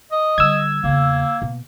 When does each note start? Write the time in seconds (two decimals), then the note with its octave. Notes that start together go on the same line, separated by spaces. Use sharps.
0.12 D#5
0.38 D3 G3 E6 G#6
0.84 E2 C#3 A#3
1.42 B2